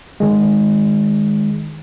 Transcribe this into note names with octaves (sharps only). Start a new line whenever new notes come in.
D#3 G#3